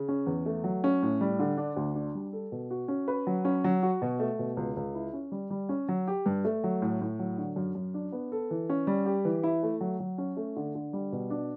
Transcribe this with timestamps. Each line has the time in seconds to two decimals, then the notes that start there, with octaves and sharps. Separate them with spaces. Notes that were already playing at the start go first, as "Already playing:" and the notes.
Already playing: C#3
0.09 C#4
0.26 E2
0.46 A3
0.64 F#3
0.84 C#4
1.02 A2
1.21 G3
1.39 D3
1.57 D4
1.76 D2
1.95 D4
2.15 G3
2.33 A4
2.52 B2
2.70 F#4
2.88 C#4
3.08 B4
3.27 F#3
3.45 C#4
3.64 F#3
3.83 F#4
4.02 B2
4.19 A3
4.39 B2
4.57 C#2
4.77 C#2
4.95 E4
5.13 C#4
5.32 G3
5.50 G3
5.69 C#4
5.89 F#3
6.08 G4
6.26 G2
6.45 A3
6.64 F#3
6.82 A2
7.01 A2
7.19 F#3
7.38 D3
7.56 F#2
7.75 F#2
7.94 D4
8.12 B3
8.32 A4
8.51 E3
8.69 C#4
8.87 G3
9.06 G4
9.25 E3
9.43 E4
9.63 A3
9.81 F#3
10.00 F#3
10.18 C#4
10.37 A3
10.56 D3
10.75 D3
10.93 G3
11.12 B2
11.30 D4